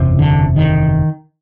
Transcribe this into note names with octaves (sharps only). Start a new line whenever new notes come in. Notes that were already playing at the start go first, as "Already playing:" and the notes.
Already playing: F#1 E2 C3
D3
D#3